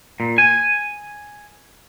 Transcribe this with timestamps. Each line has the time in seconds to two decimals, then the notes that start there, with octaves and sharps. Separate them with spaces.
0.20 A#2
0.38 G#5